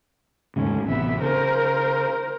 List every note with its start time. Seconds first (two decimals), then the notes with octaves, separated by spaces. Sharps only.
0.56 D#2 G#2 C#3 A3 C#4
0.86 A1 C3 B3 E5
1.21 C#3 A#4 C5